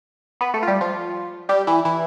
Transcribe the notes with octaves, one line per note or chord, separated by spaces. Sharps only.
B3 B4
A3 A4
F4
G3 G4
F3 F4
G3 G4
E3 E4
E3 E4